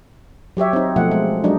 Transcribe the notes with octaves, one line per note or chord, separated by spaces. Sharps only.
F#3 G4 C#5 E5
C4 D#4
B2 F3 A3 F#5
G#3
F#3 G#3 D4 D#4